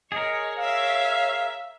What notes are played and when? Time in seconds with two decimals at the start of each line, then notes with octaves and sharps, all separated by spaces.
0.12 G#4 A#4 C#5 D#5
0.60 C#5 E5 F5